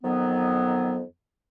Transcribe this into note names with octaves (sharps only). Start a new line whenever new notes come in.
F2 D#3 F#3 B3